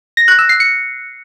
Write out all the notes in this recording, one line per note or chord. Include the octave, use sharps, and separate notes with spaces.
A#6
F#6
E6
C7
C#7